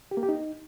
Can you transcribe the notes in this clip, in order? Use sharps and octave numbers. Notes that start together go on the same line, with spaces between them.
G4
A#3
G4
D#4